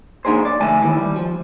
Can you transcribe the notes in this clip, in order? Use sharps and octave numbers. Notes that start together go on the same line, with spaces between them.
A#3 D4 D#4 G#4 C5
D5
D2 A3 G#5 A5
D#2 D#3 E3
G3
F3